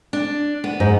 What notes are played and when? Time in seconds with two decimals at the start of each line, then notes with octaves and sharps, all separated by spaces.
0.13 D4
0.64 B3
0.80 G#2